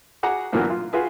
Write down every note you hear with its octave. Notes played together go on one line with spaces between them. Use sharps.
F#4 G#4 F#5 A#5 D6
A#2 D3 E3 F#3 A#3 B3
F4
F4 F#4 G#4 B4 G#5